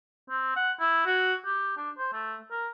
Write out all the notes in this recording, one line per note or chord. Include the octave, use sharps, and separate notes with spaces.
C4
F#5
E4
F#4
G4
D4
C5
A3
A#4